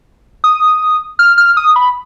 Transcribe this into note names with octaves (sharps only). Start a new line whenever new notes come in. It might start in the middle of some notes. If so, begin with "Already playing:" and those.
D#6
F6
F6
D#6
B5